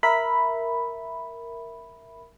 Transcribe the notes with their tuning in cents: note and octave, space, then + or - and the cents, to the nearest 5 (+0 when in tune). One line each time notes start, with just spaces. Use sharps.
A#4 +0 E5 +0 B5 +0